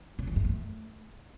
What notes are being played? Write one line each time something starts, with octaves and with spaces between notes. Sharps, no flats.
C#3
E3
G2
A3